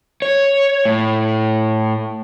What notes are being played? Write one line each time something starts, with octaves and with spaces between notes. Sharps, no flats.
C#5
A2